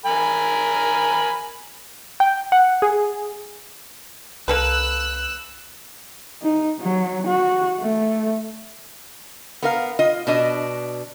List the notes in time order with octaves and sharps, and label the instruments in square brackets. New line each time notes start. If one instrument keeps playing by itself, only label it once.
[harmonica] A#4 G#5 B5
[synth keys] G5
F#5
G#4
[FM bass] C2 [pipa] A#3 A4 B4 [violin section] E6 F#6
[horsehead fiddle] D#4
F#3
F#4
A3
[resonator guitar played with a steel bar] B3 A#4 F5
F4 D#5
B2 D4 D#5